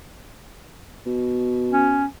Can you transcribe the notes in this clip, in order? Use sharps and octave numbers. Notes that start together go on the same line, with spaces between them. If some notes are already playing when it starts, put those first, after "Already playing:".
B2
C#4